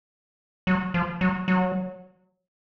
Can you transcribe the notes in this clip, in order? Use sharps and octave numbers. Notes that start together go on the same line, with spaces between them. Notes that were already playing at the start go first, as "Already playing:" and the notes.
F#3
F3
F#3
F#3